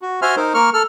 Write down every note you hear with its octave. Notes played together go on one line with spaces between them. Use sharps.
F#4
F#4 C5 E5 G#5 C6 F6
D#4 A#4 C5
A#3 A#4 C#6 F6
A4 F6